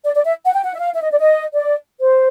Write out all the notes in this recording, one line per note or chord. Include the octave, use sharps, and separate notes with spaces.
D5
D5
E5
F#5
G5
F#5
E5
F5
E5
D#5
D5
D#5
D5
C5